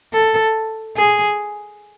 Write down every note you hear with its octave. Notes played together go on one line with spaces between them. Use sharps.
A4
G#4